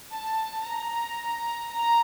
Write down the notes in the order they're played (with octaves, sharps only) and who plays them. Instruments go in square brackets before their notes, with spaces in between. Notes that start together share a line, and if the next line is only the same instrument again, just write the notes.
[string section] A5
A#5
A#5